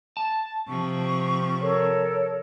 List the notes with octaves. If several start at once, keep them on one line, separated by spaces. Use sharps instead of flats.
A5
C3 F3 C#6
A4 A#4 C#5